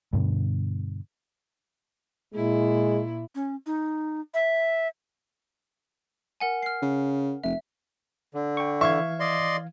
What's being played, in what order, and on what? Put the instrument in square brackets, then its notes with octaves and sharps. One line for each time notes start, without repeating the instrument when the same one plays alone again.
[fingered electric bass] G2 B2 D3
[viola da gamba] A#2 E4 [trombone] G#3
[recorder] C#4
D#4
E5
[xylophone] A#4 F#5 G#5
F6 C7
[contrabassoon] C#3
[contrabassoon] F1 [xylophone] E5
[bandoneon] D3
[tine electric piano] G5 C#6
[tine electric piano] E3 F5 G#6 [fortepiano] E5 C#6
[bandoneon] D5 D#5 C6